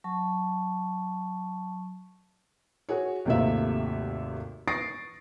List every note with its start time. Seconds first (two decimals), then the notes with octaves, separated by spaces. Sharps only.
0.04 F#3 A5 C#6
2.89 F#4 G#4 C#5
3.25 G#1 D#2 C3 A3 F4 E5
4.67 C#6 D#6 A6 A#6 C7 D7